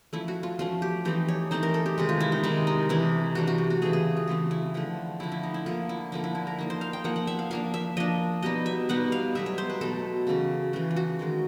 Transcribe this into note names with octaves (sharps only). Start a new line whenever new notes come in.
F3 A3 C#4 E4
F#4
F4
F3 A3 C#4 F4
G4
E3 A3 C4 D#4 G4
C#5
E3 A3 C4 D#4 C5
A#4
A4
G4
C3 D#3 G#3
F4
E4
D#4
C3 D#3 G#3 E4
D#4
C3 E3 A3 D4 E4
C3 E3 A3 D4 F#4
F#4
G4
F#4
C#3 E3 A3 C4 G#4
G#4
F4
C#3 E3 A3 C4
E4
D3 F3 A3
D3 F3 A3 E4
E4
D#4
E4
D3 F3 A#3 F4
E4
D3 F3 A#3 E4
E4
E4
A#4
F3 A#3 D#4
C5
F5
G5
F3 A#3 D#4 F#5
F#5
E5
F5
F3 A#3 D4 F5
E5
F3 A#3 D4 D#5
B2 G3 B3 D#4 D#5
E5
B2 G3 B3 D#4 F#5
F5
B2 F#3 A3 E5
C#5
C5
B4
B2 F#3 A3 A4
C#3 E3 A3 C#4
C#3 E3 A3 C#4 F#4
F4
F#4
D#3 G#3 C#4